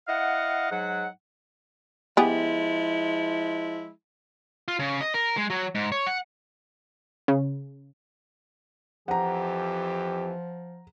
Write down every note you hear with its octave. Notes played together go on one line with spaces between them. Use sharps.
E4 D#5 F5 F#5
G#2 F#3 F#5
F3 G#3 B3 E4 G4 G#4
F4
C#3
D#5
A#4
G#3
F#3
G#2
C#5
F#5
C#3
F2 E3 F3 G4 F#5 A#5